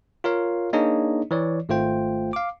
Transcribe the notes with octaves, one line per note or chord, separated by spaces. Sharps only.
F4 A#4 C#5 F5
A#3 D4 D#4 G#4 C#5 D#5
E3 C#5 D5
G#1 A3 F4 C5 G5
F5 D6